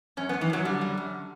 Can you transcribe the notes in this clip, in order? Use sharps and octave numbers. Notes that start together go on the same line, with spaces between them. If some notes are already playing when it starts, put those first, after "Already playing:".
F#2 C#4
B3
F#2
E3
F#2 F#3
D3 G3
D3
F#2